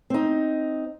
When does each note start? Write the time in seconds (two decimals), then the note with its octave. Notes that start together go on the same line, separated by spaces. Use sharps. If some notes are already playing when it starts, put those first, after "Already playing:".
0.10 C4 D#4